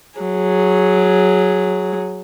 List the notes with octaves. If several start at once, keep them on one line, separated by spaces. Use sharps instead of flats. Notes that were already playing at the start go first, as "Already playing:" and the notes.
F#3 G#4